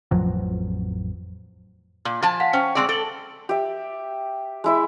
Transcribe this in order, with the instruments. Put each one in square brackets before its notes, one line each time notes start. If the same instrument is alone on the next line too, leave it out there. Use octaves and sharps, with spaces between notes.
[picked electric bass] A1 F2 F3 F#3
[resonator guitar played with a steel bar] A#2
F3 G#5 A5
[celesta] F5 F#5 B6
[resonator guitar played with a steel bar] C#4 [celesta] C5 G5 C#6
[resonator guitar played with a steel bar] G#3 C4 D5
[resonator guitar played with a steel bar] A4 [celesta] D7 F#7
[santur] G4 E5
G#3 E4 E5